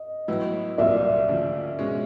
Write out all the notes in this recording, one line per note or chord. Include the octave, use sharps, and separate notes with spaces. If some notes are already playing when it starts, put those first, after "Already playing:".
Already playing: D#5
A2 F#3 B3 E4
C2 A#2 F#3 A#3 D5 E5
D2 C#3 F3
B2 G#3 C#4